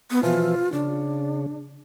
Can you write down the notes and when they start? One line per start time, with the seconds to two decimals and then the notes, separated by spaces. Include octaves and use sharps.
0.11 B3
0.23 B2 E3 F3 F4
0.73 C#3 D4